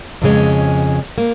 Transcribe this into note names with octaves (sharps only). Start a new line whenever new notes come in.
F2 C#3 G#3 C#4
A#3